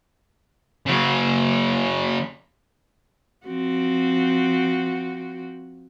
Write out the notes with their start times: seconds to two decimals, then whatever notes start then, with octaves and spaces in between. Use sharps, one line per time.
0.86 C#3 F#3
3.46 F3 C4 F#4